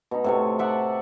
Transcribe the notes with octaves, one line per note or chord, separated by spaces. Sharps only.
B2 D#4
A2 C3 C#5
D5 E5 F#5 A5